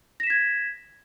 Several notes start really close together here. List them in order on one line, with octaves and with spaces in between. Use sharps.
A#6 E7 B6 G#6